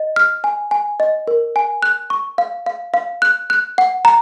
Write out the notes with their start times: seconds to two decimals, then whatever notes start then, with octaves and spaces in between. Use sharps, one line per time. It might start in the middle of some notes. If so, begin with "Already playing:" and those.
Already playing: D#5
0.16 F6
0.44 G#5
0.71 G#5
1.00 D#5
1.28 A#4
1.56 G#5
1.83 F#6
2.10 C#6
2.38 F5
2.66 F5
2.94 F5
3.22 F#6
3.50 F#6
3.78 F#5
4.05 A#5